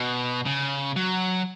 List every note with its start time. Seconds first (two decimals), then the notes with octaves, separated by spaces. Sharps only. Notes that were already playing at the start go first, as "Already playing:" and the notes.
Already playing: B2
0.46 C#3
0.96 F#3